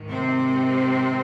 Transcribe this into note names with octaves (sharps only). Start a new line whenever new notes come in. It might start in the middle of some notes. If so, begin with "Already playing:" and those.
Already playing: G#2 D#3
C3 C4